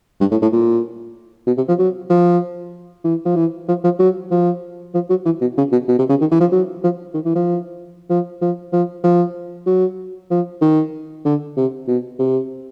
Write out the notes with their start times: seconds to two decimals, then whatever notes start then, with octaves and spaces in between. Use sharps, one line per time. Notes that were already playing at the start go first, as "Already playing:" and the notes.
0.21 G2
0.32 A2
0.42 A2
0.53 A#2
1.47 B2
1.57 C3
1.68 F3
1.79 F#3
2.10 F3
3.05 E3
3.25 F3
3.36 E3
3.68 F3
3.84 F3
3.99 F#3
4.31 F3
4.94 F3
5.10 F#3
5.25 E3
5.41 B2
5.58 C#3
5.72 B2
5.89 B2
5.99 C3
6.09 C#3
6.21 D#3
6.31 E3
6.41 F3
6.52 F#3
6.84 F3
7.14 D#3
7.26 E3
7.36 F3
8.10 F3
8.42 F3
8.73 F3
9.04 F3
9.67 F#3
10.31 F3
10.62 D#3
11.25 D3
11.57 C3
11.88 B2
12.19 C3